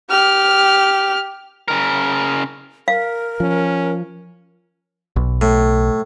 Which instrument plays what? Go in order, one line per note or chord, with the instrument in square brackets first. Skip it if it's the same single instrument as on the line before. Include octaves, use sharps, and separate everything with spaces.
[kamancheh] G4 F6
[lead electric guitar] C#3 A#4
[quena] A#4 [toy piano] F5
[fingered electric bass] F3 [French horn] C#4
[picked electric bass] B1
[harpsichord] A2